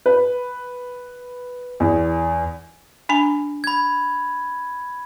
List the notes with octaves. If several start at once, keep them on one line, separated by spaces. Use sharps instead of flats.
B4
E2
D4 G#5 A#5
B5 G#6